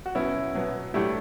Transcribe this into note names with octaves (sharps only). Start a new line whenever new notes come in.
F#4
B2 F#3 B3 C#4 E4
B2 F#3 B3
A2 F#3 A3 D4 E4 G4